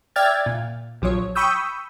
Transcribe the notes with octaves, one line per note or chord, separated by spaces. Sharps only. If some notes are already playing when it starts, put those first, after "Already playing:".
D5 E5 G5 F6 G#6 A6
A#2
A#1 F3 F#3 C#5
G5 B5 C#6 D#6 E6 G6